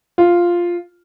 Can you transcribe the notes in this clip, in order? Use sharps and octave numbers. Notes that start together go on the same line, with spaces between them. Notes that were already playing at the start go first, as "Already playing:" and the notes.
F4